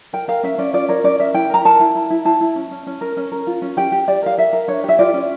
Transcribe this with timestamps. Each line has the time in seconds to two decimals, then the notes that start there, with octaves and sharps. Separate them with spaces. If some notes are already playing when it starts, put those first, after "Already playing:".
0.13 A#4 G5
0.28 A#4 F5
0.43 C#4 E5
0.58 C#4 D5
0.73 F4 D5
0.89 A#4 C#5
1.04 C#4 D5
1.19 A#4 E5
1.34 E4 G5
1.50 A#4 A#5
1.65 A#4 A5
1.80 E4
1.95 E4
2.10 E4
2.25 E4 A5
2.41 E4
2.56 C#4
2.71 C#4
2.87 C#4
3.01 A#4
3.17 C#4
3.32 A#4
3.47 F4
3.62 C#4
3.77 G4 G5
3.92 G4
4.08 G4 D5
4.22 A#4 F5
4.38 A#4 E5
4.53 A#4
4.68 D4 C#5
4.84 G4 E5
4.99 F4 D5
5.14 C#4